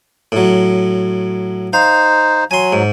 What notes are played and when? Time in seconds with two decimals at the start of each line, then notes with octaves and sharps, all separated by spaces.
0.32 A2 F#3
1.73 D#4 C5 F5
2.51 F#3 G#5 C6
2.73 G#2